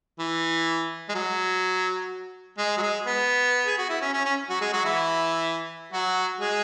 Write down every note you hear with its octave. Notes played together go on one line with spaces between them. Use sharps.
E3
G#3
F#3
G#3
F#3
G#3
B3
G#4
F#4
E4
C#4
C#4
C#4
F#3 F#4
G#3 G#4
F#3 F#4
E3 E4
F#3 F#4
G#3 G#4